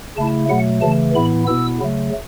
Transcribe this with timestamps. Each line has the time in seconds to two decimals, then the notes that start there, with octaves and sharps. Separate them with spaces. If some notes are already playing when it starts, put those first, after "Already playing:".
0.17 C#3 A3 E4 A5
0.49 B2 F#3 A3 F#5
0.82 C#3 E3 A3 A5
1.15 A2 E3 B3 E4 B5
1.47 B2 B3 E4 E6
1.80 C#3 F#3 A3